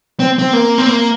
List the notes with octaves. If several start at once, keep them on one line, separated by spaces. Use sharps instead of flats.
C4
C4
A#3
C4
A#3